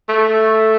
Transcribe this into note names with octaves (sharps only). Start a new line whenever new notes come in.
A3